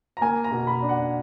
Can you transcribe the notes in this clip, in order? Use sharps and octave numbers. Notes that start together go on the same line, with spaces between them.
A#5
A#3 G#5
A#5
B2
B5
D4
F#5